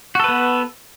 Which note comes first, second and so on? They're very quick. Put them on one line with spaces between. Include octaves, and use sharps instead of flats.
F#4 A4 B4 B3